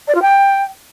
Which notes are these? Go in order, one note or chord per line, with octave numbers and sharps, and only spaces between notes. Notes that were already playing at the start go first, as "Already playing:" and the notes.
D5
F4
G5